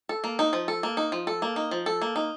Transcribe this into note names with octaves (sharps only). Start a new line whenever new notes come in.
A4
A#3
D#4
F3
A4
A#3
D#4
F3
A4
A#3
D#4
F3
A4
A#3
D#4